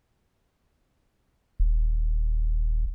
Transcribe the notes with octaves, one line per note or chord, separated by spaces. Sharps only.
D#1